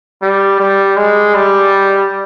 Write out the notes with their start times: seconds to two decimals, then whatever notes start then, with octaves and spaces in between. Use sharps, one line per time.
0.22 G3
0.60 G3
0.97 G#3
1.35 G3